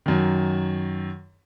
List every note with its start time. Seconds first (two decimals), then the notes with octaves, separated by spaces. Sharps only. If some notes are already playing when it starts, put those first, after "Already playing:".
0.06 F#2 D#3